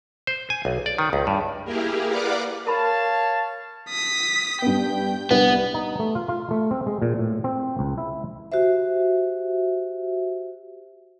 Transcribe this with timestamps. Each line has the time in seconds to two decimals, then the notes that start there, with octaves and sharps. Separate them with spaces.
0.27 C5
0.50 G#5
0.65 B1
0.86 D5
0.98 D#3
1.13 C#2
1.27 G2
1.65 A#3 E4 G4 G#4 A#4
2.08 A#4 B4 D5 F5 F#5 D6
2.67 A#4 C#5 F5 A5 B5
3.89 D#6 B6
4.62 G2 B3 G5
5.31 C2 B3 D4 B4
5.74 D#4
5.99 A3
6.15 F4
6.29 F4
6.51 A3
6.71 C4
6.86 G#3
7.02 A#2
7.19 A2
7.44 C4
7.79 C#2
7.98 E4
8.52 F#4 G4 C5 E5